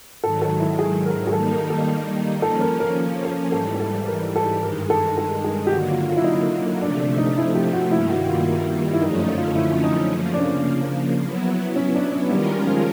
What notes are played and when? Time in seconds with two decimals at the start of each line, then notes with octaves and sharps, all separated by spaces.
0.23 G#2 D#3 F#3 A4
0.42 A4
0.60 E4
0.79 G#4
1.06 A#4
1.27 G#4
1.33 D#3 G3 A#3 D#4 A4
1.52 A#4
1.70 A4
2.42 F3 A#3 C#4 A4
2.61 A#4
2.80 A#4
3.25 A4
3.52 G#2 E3 G3 A4
3.80 A4
4.07 A#4
4.36 A4
4.62 G2 D#3 G#3 A#4
4.90 A4
5.18 A4
5.44 G#4
5.67 G4
5.72 D3 F#3 A#3 F#4
5.90 F4
6.09 F4
6.17 E4
6.24 D#4
6.33 E4
6.81 C3 F3 A3 D4
7.00 D4
7.18 D#4
7.37 E4
7.55 G4
7.73 F#4
7.91 G2 D#3 G3 A#3 E4
8.10 F#4
8.29 F4
8.93 E4
9.01 F#2 D3 F3 A3 C#4 D#4
9.20 D#4
9.38 F4
9.56 E4
9.84 D#4
10.12 C#3 F3 A#3
10.34 D4
10.38 C#4
11.21 F#3 B3 E4
11.76 C#4
11.94 D4
12.12 C#4
12.30 D#3 G3 G#3 C#4 F4 A#4
12.67 F3